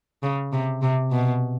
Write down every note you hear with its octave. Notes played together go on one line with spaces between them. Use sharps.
C#3
C3
C3
B2